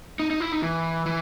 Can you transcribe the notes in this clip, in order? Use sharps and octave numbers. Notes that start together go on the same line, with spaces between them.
D#4
D#4
E4
D#4
E3
E3